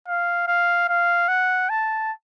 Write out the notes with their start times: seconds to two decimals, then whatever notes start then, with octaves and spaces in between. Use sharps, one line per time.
0.08 F5
0.48 F5
0.89 F5
1.28 F#5
1.69 A5